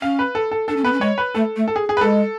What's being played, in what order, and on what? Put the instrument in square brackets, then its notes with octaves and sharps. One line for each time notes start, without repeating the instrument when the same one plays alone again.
[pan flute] C#4 [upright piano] F5
[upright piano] B4
A4
A4
[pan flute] D4 [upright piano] A4
[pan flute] C#4
[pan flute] B3 [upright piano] B4
[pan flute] C#4
[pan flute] G#3 [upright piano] C#5
[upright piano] B4
[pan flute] A3 [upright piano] A4
[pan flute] A3
[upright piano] A4
G#4
G#4
B4
[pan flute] G#3 [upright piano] A4